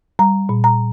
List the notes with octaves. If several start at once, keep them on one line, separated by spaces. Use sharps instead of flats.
G3 A#5
A#2
A#5